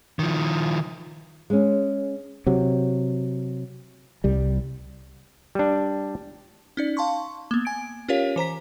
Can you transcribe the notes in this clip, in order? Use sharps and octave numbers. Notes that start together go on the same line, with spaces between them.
D#3 F3
G#3 C#4
C3 F#3
C2 G3
G3 D4
C#4 D#4 D5
F5 A5 C6 C#6
A#3 B3
G#5 G#6 D7
C#4 F4 G4 A#4 C#5 F5
E3 C5 A#5 B6